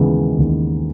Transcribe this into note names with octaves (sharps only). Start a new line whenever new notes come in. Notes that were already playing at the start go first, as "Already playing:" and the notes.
Already playing: D#2 C#3 E3 G#3 B3
D#2